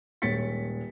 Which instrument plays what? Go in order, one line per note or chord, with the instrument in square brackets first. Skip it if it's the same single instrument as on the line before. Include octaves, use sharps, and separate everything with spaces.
[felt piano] D#1 G#3 C#5 A6 B6 C#7